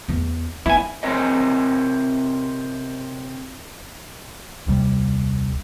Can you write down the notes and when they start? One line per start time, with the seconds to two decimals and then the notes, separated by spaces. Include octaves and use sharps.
0.09 E2 B3
0.66 B3 E4 G#5
1.03 C3 C4 A#4 C#5 D#5
4.67 D#1 C2 G3